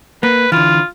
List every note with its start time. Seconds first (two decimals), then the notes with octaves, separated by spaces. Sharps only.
0.23 A#3 B4
0.52 D3 E3 F4